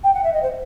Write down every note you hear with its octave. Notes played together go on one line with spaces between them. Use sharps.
G5
F#5
E5
D#5
C5